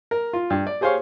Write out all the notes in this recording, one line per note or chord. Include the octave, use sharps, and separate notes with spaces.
A#4
F4
G2
D5
G4 G#4 C5 C#5 F5 C#6